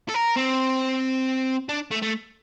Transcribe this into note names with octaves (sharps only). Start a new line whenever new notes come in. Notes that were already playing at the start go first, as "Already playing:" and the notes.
A4
A#4
C4
D4
A3
A3